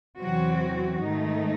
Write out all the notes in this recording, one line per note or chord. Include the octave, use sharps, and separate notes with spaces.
E2 C3 E3 F#3 C4 F#4
G#2 D#3 A3 D#4